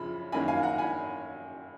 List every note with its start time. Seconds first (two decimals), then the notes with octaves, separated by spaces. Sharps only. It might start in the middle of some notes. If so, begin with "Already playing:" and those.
Already playing: F#2 C#3 F3 B5
0.32 F#2 D#3 A#3 G#5 B5
0.48 F5 G#5
0.63 F#5 A#5
0.78 G#5 B5